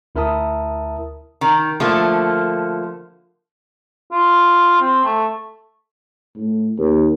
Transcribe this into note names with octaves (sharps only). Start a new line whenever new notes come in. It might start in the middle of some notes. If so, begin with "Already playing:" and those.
D2 E4 A#4 E5 A5 D#6
D#3
D3 F3 A3 A#3
F4
C4
A3
A2
D#2